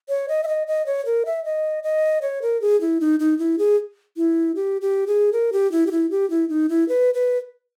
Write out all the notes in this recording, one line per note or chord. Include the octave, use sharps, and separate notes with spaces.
C#5
D#5
E5
D#5
D#5
C#5
A#4
E5
D#5
D#5
C#5
A#4
G#4
E4
D#4
D#4
E4
G#4
E4
G4
G4
G#4
A#4
G4
E4
G4
E4
G4
E4
D#4
E4
B4
B4